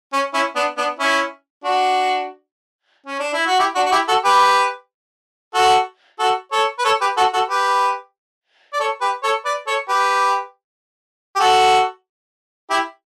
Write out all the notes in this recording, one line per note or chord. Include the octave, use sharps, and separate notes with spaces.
C#4
C#4 E4
B3 D4
B3 D4
C#4 E4
D4 F#4
C#4
D4
E4
F#4
E4 G4
D4 F#4
F#4
E4 G4
F#4 A4
G4 B4
F#4 A4
F#4 A4
A4 C#5
B4
A4 C#5
G4 B4
F#4 A4
F#4 A4
G4 B4
D5
A4 C#5
G4 B4
A4 C#5
B4 D5
A4 C#5
G4 B4
G4
F#4 A4
E4 G4